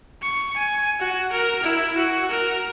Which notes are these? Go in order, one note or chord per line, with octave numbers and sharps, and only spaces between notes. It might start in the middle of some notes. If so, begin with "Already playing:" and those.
C#6
G#5
F#4
A#4
E4
F#4
A#4